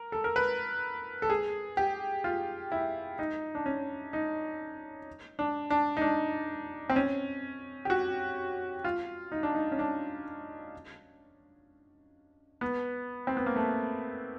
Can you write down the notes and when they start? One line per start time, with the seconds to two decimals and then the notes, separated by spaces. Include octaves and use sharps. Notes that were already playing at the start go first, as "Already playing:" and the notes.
Already playing: A#4
0.12 A4
0.24 A#4
0.36 B4
1.22 A4
1.30 G#4
1.77 G4
2.24 F4
2.72 E4
3.19 D#4
3.55 D4
3.66 C#4
4.13 D#4
5.39 D4
5.70 D4
5.97 D#4
6.01 D4
6.90 C4
6.96 C#4
7.85 G4
7.90 F#4
8.84 F4
9.32 D#4
9.43 D4
9.55 D#4
9.72 C#4
9.79 D4
12.61 B3
13.27 C4
13.37 B3
13.46 A#3
13.56 A3